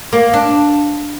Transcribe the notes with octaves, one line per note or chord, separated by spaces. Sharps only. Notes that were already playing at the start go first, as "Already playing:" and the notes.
A#3
D4